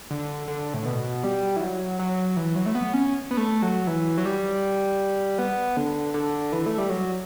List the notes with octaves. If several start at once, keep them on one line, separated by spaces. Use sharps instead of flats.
D3
D3
A2
B2
G3
E3
F#3
F#3
E3
F#3
A3
B3
C#4
B3
A3
F#3
E3
F#3
G3
B3
D3
D3
E3
A3
G3
F#3